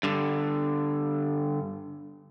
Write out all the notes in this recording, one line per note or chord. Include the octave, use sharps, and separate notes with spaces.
G2 D3